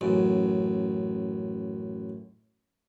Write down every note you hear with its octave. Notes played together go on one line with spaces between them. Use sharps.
A1 F#2